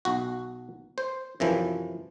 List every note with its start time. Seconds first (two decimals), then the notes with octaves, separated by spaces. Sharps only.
0.05 B1 F#4
0.98 C5
1.40 F#2 C3 E3 F3